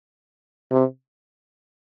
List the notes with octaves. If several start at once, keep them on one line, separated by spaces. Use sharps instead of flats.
C3